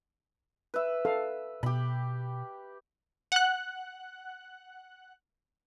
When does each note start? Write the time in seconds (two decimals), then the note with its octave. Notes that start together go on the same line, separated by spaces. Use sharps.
0.74 B4 E5
1.05 A4 F5
1.63 B2 G4 B5
3.32 F#5 F#6